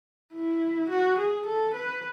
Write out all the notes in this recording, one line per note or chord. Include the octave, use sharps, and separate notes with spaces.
E4
F#4
G#4
A4
B4